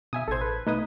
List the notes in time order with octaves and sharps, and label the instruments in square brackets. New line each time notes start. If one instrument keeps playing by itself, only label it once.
[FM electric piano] B2 [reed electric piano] E5 G#5 D#6
[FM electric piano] A1 G#6 [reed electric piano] A4 C5
[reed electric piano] B4
[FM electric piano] B2 A3 [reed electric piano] D#4 B4 D#6